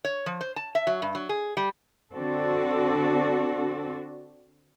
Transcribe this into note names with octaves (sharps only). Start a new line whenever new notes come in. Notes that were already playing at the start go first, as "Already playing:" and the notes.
C#5
F3
C5
A5
E5
F#3
G2
F#3
G#4
G3
D3 C4 D4 F#4 A4